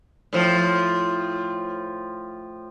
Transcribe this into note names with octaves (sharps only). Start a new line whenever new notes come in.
A2 F3